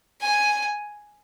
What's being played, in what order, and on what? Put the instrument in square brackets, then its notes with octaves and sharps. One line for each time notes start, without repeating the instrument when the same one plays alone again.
[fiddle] G#5